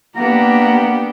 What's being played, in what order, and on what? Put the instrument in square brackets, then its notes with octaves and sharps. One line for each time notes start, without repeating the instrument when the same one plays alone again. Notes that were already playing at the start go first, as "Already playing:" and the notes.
[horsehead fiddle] A#3 [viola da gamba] B3 D4 G4 [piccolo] F#5 [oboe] A#5